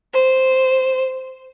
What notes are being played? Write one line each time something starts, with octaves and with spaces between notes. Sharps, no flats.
C5